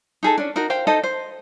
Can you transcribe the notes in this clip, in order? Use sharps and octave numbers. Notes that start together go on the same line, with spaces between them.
D#4 G#4 A4
C#4 D4
D#4 F#4 A#4
C5 F5 G5
D#4 A4 C5 D#5
C5